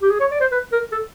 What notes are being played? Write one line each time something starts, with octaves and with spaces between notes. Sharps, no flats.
G4
G#4
C#5
D5
C5
B4
A#4
A4